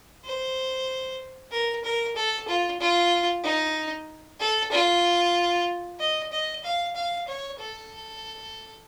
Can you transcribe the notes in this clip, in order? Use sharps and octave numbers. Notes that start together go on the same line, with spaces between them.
C5
A#4
A#4
A4
F4
F4
D#4
A4
F4
D#5
D#5
F5
F5
C#5
A4